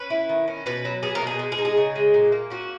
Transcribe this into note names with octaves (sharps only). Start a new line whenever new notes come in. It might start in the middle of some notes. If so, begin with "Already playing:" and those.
Already playing: C#4 B4
E4
D#3
C#4
B2 B4
F#3
B3 G#4
A#4
B2 G#4
G#3
G#4
D#4
G#4
C#3
G#3
A#2
A#3
C#4 F#4